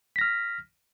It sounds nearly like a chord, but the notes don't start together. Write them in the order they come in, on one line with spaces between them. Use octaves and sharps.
B6 A#6 F6